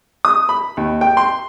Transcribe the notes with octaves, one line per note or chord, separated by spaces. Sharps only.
D#6
B5
D#2
G5
C6